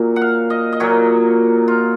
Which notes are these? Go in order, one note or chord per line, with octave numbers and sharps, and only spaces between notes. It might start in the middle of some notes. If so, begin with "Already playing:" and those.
Already playing: A#2 F#3 A#3
F#5
F5
D#5
D#5
A#2 F#3 A#3 C#5
F4